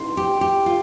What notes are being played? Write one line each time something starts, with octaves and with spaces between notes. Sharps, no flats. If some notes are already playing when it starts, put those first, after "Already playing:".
Already playing: C6
G4
G4
F4